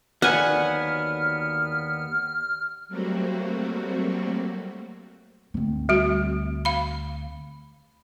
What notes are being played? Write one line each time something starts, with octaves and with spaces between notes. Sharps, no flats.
D#2 D3 F#3 A#3 B3 F#5 G#5 F6
F#3 G3 A3 A#3 C4 F#4
D2 C4
G3 F#4
F5 B5